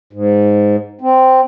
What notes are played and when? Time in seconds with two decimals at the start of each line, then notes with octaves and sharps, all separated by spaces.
0.13 G#2
1.01 C4